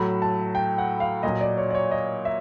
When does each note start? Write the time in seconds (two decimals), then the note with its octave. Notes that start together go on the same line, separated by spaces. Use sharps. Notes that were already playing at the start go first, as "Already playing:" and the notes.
Already playing: A2 F#3 B5
0.22 A5
0.55 G5
0.78 F#5
1.00 F5
1.23 A#2 F#3 D#5
1.41 D5
1.58 C#5
1.71 D5
1.75 C#5
1.91 D#5
2.25 E5